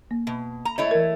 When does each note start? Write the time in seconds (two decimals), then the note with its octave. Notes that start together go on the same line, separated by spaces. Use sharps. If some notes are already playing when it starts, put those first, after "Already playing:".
0.11 A#3
0.27 B2
0.65 A#5
0.78 A3 E4 C#5 D#5
0.91 E3 A#4